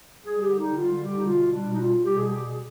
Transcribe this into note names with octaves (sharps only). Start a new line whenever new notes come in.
G3 G#4
D3 G4
G3 D#4
D3 F4
G3
G4
D3
D#4
B2 F4
G3
D4
B2
D#4
G3 F4
G3
G4
B2 G#4
G3 G4
B2 G#4